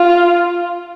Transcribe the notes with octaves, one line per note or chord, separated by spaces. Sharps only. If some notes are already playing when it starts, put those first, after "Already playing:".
Already playing: F4